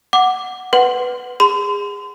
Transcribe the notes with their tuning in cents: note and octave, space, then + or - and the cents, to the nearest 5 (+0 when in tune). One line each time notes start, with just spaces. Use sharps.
F#5 +0 D6 +0
B4 +0 F#5 +10 C6 +0
G#4 -30 C6 -35